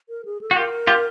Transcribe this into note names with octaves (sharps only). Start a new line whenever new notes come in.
A#4
G#4
A4
F#4
F4 G4 A#4
F4 G4